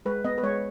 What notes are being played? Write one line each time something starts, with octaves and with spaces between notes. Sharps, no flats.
G#3 B4
B3 D#5
B4
G#3 C#5